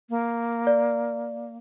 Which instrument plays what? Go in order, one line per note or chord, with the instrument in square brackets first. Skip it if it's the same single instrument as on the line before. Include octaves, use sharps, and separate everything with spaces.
[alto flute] A#3
[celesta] D5